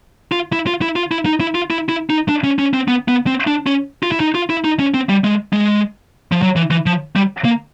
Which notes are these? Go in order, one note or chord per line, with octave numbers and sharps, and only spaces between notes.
F4
E4
F4
E4
F4
E4
D#4
E4
F4
E4
E4
D#4
D4
C#4
C#4
C4
B3
B3
C4
D4
C#4
F4
E4
D#4
F4
E4
D#4
C#4
C4
G3
G#3
G#3
F3
F#3
E3
E3
F3
G3
A#3